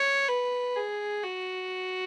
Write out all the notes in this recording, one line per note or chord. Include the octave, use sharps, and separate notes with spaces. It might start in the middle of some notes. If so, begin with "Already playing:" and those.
Already playing: C#5
B4
G#4
F#4